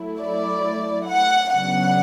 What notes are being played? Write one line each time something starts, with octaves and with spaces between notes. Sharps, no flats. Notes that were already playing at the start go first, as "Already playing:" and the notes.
Already playing: F#3 A3 E4
D5
F#5
C#3 F#3 B3 D4 F#5